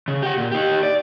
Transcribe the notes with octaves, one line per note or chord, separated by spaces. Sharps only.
C#3
G4 F#5
A#2
D#4 G4
D5